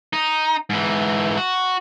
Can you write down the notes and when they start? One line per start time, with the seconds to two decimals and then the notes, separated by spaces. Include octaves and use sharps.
0.13 D#4
0.70 G#2 E3
1.37 F#4